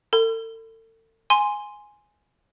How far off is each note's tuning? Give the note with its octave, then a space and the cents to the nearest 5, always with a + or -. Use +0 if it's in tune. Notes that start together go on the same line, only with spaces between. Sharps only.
A4 +40 B5 +40
G#5 +0 C6 +0